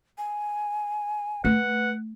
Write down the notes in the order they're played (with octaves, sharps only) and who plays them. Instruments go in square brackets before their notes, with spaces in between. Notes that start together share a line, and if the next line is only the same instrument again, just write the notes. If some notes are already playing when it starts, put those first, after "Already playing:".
[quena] G#5
[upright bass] A3 [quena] B4 [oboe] F#5